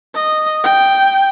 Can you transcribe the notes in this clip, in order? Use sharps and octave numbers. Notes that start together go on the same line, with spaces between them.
D#5
G5